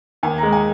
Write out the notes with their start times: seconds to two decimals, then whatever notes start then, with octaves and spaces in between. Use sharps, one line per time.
0.23 D#2 G#5
0.38 G#3 A#5
0.52 G#5